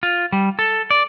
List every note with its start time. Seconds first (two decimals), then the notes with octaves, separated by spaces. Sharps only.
0.03 F4
0.32 G3
0.59 A4
0.91 D5